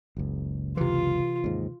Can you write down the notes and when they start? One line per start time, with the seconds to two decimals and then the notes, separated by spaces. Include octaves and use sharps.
0.17 F#1 C#2
0.77 C3 E3 F4
1.44 D#2 G#2